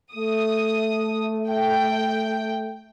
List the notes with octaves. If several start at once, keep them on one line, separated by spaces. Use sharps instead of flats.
A3 D#6
G5